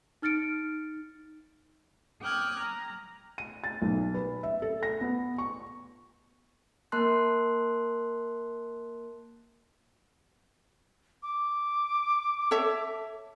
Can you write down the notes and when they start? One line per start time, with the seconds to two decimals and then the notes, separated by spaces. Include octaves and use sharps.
0.22 D#4 F6 A6 C#7 D7
2.20 G5 D6 D#6 F6 F#6 G#6
2.59 A#5
3.38 D#7
3.64 A6
3.82 B1
4.14 B4
4.43 E5
4.62 A4
4.83 A#6
5.01 B3
5.38 C#6
6.92 A#3 A#4 A5 C6 F#6
11.23 D6
12.51 A4 C#5 E5